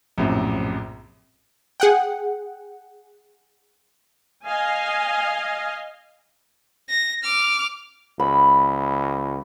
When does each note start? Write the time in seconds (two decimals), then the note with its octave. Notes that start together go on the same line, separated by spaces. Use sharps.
0.18 A#1 F#2 A2 C3
1.80 G#4 F#5 G5
4.46 D#5 F5 G#5
6.90 A#6
7.23 D6 F6
8.20 C#2 B5